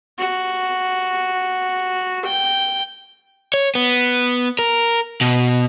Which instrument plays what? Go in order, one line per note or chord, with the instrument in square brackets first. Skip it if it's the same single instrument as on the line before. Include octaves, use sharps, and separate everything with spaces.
[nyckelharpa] F#4
G5
[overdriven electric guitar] C#5
B3
A#4
B2